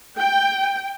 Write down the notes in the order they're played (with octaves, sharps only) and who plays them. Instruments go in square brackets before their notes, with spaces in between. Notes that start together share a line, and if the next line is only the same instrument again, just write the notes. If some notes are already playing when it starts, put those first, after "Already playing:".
[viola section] G5